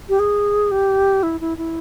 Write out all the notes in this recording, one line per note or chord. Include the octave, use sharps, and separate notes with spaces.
G4
G#4
G4
E4
E4
E4